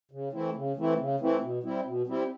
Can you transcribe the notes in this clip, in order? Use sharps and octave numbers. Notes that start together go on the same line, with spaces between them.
C#3
E3 A3 C4 E4
C#3
E3 A3 C4 E4
C#3
E3 A3 C4 E4
B2
G3 C4 E4
B2
G3 C4 E4